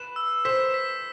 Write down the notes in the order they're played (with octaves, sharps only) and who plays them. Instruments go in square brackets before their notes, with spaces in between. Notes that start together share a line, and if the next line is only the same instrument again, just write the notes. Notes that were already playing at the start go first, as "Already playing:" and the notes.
Already playing: [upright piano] B4 [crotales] E7
[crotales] E6
[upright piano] C5 [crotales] B6
[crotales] B6